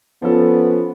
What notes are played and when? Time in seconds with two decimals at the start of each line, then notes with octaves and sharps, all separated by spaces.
0.22 F3 B3 C#4 A4